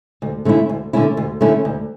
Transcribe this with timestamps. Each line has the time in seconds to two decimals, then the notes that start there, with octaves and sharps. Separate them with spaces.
0.22 D2
0.45 D3 A3 C#4 E4
0.69 D2
0.93 D3 A3 C#4 E4
1.17 D2
1.41 D3 A3 C#4 E4
1.65 D2